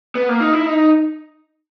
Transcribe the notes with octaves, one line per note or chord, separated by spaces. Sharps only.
B3
A#3
D#4
E4
D#4